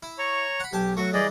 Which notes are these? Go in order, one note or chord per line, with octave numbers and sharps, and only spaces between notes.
E4
C#5 A#5 C#6
F#5 B5
B1 G4 G#5 A5
F#3 A3 F#4 C#6
E3 G3 G#4 D5 D#5